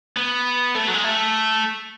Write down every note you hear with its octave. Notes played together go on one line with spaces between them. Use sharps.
B3
A3
F#3
G#3
A3